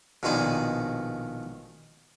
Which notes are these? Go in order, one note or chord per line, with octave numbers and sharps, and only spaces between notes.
A#1 B2 D#3 C5 D5 G#5